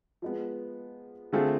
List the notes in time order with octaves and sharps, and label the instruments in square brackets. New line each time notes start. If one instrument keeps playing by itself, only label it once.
[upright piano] F3 G#3 B3
D3 A3 C4 F4 G#4